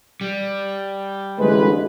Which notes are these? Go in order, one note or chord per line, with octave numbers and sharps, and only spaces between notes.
G3
A1 D2 G#3 B4